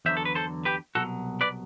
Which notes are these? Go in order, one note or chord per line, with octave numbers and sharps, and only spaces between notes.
E2 D3 F#3 C5 E5
A4
B4
A4 C5
G4 B4
C2 B2 F#3 F#4 A4
B4 D5